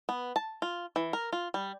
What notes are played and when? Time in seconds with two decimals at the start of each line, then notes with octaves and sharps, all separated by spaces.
0.09 B3
0.36 A5
0.62 F4
0.96 E3
1.13 A#4
1.32 F4
1.54 G3